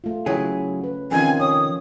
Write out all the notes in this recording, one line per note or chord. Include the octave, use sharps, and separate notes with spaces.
A3 F4
C#3 F#3 C#4 E4 G#4 C#5
B4
F2 C3 D#3 F3 C#4 F4 G#5
C#5 D#6